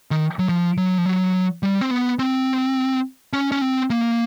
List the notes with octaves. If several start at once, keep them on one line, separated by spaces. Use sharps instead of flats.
D#3
F#3
F3
F#3
F3
F#3
G3
C4
B3
C4
C#4
C#4
C4
A#3